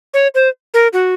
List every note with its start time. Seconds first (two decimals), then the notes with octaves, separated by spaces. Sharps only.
0.14 C#5
0.35 C5
0.74 A#4
0.93 F#4